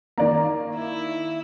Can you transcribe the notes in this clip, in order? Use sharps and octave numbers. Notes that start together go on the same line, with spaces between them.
D#3 A#3 D5 A#5
E4